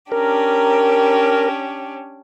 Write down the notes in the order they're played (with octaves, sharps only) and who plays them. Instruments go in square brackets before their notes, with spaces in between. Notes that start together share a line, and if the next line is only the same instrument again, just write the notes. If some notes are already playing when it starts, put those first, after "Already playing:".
[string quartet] C#4 D4 G4 [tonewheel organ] A#4